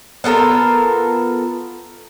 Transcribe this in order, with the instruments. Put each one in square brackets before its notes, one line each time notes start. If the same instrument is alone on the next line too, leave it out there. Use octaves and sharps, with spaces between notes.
[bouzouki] B3 F4 A4 A#4